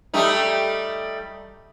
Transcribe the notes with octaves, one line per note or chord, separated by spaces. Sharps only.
G3 A3 D#4